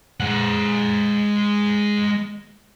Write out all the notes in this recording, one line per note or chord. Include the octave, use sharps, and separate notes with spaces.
G#3 F#5